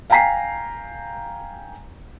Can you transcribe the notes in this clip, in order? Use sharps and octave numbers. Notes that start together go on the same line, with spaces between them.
F5 G5 G#5 A#5 B6 C7